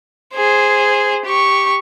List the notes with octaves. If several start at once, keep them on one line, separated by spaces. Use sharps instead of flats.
G#4 C5
G4 C#6